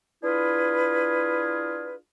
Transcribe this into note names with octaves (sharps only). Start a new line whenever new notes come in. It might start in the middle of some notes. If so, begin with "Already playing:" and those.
D4 E4 F4 G#4 B4